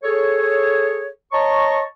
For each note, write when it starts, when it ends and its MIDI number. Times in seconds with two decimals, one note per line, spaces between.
0.04 1.07 68
0.04 1.07 69
0.04 1.07 73
1.32 1.81 73
1.32 1.81 75
1.32 1.81 81
1.32 1.81 82
1.32 1.81 85